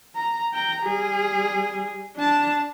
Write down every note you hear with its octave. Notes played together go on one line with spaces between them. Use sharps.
A#5
G5 A#5
G3 G#4
D4 A5